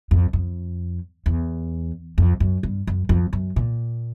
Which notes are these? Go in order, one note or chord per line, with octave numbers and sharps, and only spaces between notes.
F2
F2
E2
F2
F#2
G2
F#2
F2
F#2
A#2